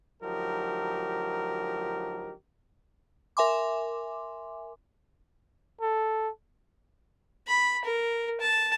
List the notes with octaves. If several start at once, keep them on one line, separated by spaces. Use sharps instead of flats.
D2 F3 F#3 D#4 G4 A#4
A#4 E5 G#5 C6 D6
A4
B5
A#4
A5